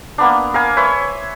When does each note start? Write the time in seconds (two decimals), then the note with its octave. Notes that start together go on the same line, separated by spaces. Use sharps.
0.18 A#3 B3 D4
0.54 A#4 F5 G#5
0.77 B4 C#5 E5 C6